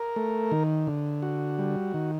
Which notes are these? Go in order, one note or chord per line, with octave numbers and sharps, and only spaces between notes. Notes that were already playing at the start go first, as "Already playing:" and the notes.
Already playing: A#4
A3
D#3
D3
F#4
G3
D#3